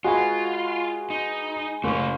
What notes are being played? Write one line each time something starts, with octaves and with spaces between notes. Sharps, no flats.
G#3 F4 F#4 B4 G#5
D#4
F#1 A3 C#4 D6